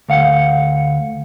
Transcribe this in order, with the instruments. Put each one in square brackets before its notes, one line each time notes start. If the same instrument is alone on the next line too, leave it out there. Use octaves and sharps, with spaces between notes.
[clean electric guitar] D2 F5 F#5